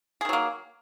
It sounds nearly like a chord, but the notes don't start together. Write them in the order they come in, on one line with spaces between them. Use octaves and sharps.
G#4 D#3 F#3 A#3